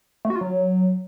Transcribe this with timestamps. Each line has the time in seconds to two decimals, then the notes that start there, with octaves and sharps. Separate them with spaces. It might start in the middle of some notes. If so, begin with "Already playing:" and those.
0.25 A3
0.30 F#4
0.36 F4
0.41 F#3